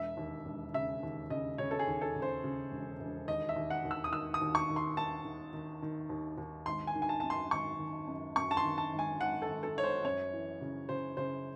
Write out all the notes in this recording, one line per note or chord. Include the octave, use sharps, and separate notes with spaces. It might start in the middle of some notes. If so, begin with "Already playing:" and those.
Already playing: E1 E5
D#2
E1
C#3 E5
D#2
C#3 D#5
C#3 C#5
A4
G#4
D#2
A4
C#3
C5
C#3
E1
E1
D#2 D#5
E5
D#2
F#5
D#2
E6
D#6
D#3 E6
D#6
D#2
C#6
D#3
C6
D#2 A5
D#3
D#3
D#3
D#2
D#2
G#1 C6
G#5
D#3
G#5
A5
F#2 A5
C6
G#1 C#6
D#3
F#2
F#2 C#6
A5
C6
D#3
A5
G#1
G#5
G#1 F#5
A4
G#1
A4
G#1 C#5
C5
F#2 C#5
E3
C#3
C#3 C5
C#3 C5